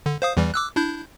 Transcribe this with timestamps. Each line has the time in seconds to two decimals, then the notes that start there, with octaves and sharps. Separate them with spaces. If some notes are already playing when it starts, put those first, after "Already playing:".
0.06 D3
0.22 C5 F5 D#6
0.37 E2 E3 G3
0.54 D6 E6 F#6
0.76 D4 E4 G6